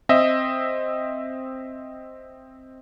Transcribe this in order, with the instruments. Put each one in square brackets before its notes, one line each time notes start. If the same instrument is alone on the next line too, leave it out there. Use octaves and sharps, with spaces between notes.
[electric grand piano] C4 D#5 E5